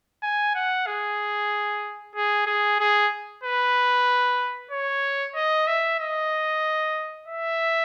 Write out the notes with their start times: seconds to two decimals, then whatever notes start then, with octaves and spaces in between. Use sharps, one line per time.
0.22 G#5
0.55 F#5
0.86 G#4
2.15 G#4
2.46 G#4
2.80 G#4
3.43 B4
4.71 C#5
5.35 D#5
5.67 E5
6.00 D#5
7.28 E5